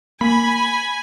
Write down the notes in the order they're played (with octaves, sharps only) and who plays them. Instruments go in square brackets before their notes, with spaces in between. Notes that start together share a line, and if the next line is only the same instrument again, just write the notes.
[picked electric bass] A#3 [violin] G#5 [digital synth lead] B5